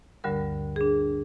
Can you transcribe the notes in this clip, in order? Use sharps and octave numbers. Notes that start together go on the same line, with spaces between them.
D2 G2 D3 G3 A#4
D4 G#4